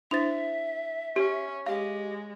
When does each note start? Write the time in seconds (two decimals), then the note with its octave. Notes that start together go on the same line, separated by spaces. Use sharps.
0.11 D4 E4 C5 E5 A6 F7
1.16 C#4 G4
1.66 G#3 G4 F5